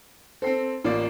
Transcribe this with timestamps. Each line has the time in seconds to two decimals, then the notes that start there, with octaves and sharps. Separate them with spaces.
0.42 C4 A4 C5 C7
0.84 A1 A#3 F4 D5